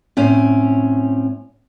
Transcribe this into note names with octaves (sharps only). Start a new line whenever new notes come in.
A2 C4 C#4